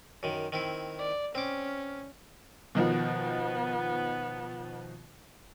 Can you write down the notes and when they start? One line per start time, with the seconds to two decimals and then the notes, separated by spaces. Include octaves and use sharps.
0.23 F#2 D#3
0.52 D#3 C4 E4
0.99 D5
1.35 C4 C#4 D6
2.75 B2 D#3 F3 B3